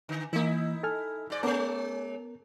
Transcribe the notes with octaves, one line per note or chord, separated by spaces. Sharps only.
D3
E3 A#3 D#4 E4
A4 G#5 F6
G#2 D5
G#3 B3 C#4 A#4